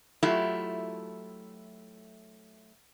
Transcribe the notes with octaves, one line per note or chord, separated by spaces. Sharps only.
F#3 A3 E4 F4 G4